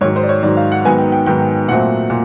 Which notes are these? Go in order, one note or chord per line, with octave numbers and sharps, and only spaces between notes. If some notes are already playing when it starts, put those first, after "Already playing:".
G#2 D#3 F#3 C#5
C5
D5
C#5
G#2 D#3 F#3 D5
F5
F#5
G#2 D#3 F#3 B3 G#5
G5
G5
G#2 D#3 F#3 B3 G5
A#2 F#3 A3 C4 F#5
A#2